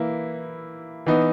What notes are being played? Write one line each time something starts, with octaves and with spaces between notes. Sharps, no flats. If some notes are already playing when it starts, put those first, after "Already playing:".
Already playing: E3 A#3 E4
E3 B3 D#4